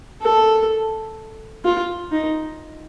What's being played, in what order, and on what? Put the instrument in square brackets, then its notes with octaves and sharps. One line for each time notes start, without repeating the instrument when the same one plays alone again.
[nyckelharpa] A4
F4
D#4